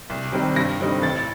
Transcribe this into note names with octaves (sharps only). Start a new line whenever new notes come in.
C2
C3 D#3 G3 C4
G2 A#6
D3 G3 C4 D#4
A1 A6